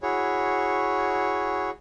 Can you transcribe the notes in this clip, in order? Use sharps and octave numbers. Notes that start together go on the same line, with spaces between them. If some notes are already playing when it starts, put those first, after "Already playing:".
E4 F#4 G#4 C#5